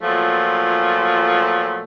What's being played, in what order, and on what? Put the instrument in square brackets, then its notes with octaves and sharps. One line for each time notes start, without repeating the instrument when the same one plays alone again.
[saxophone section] A#2 F3 F#3 A3